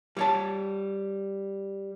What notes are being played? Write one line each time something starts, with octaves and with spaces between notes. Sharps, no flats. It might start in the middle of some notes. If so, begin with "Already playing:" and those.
G3 C#5 A5